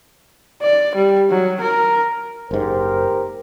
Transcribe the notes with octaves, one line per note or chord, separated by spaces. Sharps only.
D5
G3
F#3
A#4
F#1 G#2 G4 A#4 C5